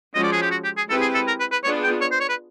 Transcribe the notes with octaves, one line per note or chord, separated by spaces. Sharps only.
F3 G#3 C#4 F#4 D#5
D5
G#4
G4
F#4
G4
G#4
G#3 C4 E4 G4 A4 B4
G#4
A4
A#4
B4
B4
B3 D4 F4 G#4 C#5
G5
C#5
C5
C#5
B4